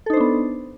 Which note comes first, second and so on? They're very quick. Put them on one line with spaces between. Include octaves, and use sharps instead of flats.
A4 D#4 C5 D4 B3